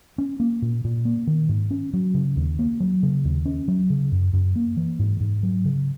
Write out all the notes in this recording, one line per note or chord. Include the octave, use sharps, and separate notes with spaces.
C#4
A#3
A#2
A#2
A#3
D#3
G#2
C#4
F#3
C#3
D#2
A#3
F#3
C#3
D#2
C#4
F#3
C#3
F#2
F#2
A#3
E3
G#2
G#2
F#3
C#3